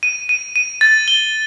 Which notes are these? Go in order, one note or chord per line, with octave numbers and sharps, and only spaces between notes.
D#7
D#7
D#7
A6
G7